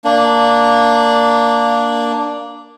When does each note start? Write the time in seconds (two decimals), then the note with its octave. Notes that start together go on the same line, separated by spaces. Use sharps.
0.05 A#3 D4